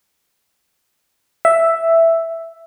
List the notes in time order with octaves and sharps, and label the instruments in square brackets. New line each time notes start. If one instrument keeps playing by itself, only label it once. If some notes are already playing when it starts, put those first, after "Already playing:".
[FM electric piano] E5